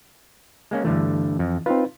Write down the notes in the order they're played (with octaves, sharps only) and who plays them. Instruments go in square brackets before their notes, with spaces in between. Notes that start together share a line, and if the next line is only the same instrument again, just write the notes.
[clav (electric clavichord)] G#3 A#3 C#4
[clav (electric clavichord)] G2 D3 A3 [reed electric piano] E3
[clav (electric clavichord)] F2
[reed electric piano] C4 D#4 B4 [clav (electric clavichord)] F4